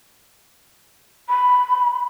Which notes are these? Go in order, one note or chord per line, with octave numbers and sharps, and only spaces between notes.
B5